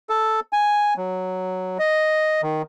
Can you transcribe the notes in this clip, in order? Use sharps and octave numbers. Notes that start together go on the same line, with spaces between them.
A4
G#5
F#3
D#5
D#3